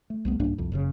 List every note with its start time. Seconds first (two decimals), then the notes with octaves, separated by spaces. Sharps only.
0.10 A3
0.25 C2 A3 B3
0.39 C2 G#2 A#3 D4
0.58 C2 F2
0.72 F#1 A2 C#3